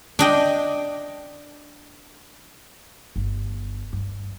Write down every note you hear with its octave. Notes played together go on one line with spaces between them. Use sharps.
D4 D#5 G5
G1
G2